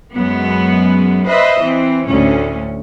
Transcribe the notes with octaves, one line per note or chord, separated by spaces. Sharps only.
F#2 G#3 B3
B4 C5 D#5 E5
E3 C4
D2 A2 C#4